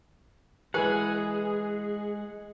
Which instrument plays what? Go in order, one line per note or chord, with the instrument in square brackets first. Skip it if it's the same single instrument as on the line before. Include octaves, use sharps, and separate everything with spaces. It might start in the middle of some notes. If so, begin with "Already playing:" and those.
[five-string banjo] E3 B4 [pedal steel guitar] G#3 F#5 [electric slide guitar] G#4